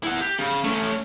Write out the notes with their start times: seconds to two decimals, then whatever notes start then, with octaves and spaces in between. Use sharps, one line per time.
0.04 E4 F#5
0.21 G4
0.38 C#3
0.64 A3 C#4